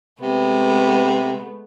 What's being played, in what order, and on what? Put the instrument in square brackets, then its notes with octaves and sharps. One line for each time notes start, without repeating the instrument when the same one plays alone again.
[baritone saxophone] C3 [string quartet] G#3 A3 B3